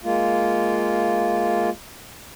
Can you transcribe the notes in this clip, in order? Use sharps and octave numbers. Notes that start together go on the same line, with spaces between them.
G#3 A#3 F4